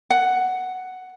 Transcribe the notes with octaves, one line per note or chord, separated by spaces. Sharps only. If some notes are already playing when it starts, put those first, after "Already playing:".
F#5